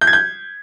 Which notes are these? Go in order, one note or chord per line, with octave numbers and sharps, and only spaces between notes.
G6
G#6
G6